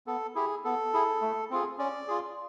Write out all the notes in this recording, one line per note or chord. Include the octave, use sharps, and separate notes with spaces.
B3 A4
E4 G4 G#4
B3 A4
E4 G#4
A3
C4 F4 G#4
C#4 D5
F4 G#4